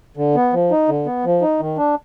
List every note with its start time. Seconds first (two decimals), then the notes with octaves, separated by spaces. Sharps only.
0.17 D3
0.36 B3
0.53 F3
0.71 D#4
0.88 D3
1.06 B3
1.25 F3
1.42 D#4
1.60 D#3
1.78 D4